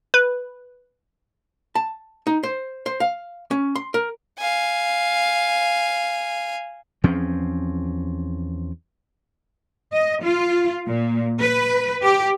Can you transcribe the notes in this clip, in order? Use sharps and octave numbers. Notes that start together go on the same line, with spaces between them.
B4
A5
D#4
C5
C5
F5
C#4
C6
A#4
F5 G#5
E2 F3 C4 C#4
D#5
F4
A#2
B4
G4